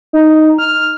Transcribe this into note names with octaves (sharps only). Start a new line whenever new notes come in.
D#4
F6